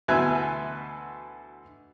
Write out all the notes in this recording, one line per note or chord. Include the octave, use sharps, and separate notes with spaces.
D2 B2 E3 B4 E5 G#5